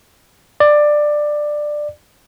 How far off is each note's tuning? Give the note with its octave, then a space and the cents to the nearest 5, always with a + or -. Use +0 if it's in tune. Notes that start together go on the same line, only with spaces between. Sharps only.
D5 +15